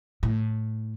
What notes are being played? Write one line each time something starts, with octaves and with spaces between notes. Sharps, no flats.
A2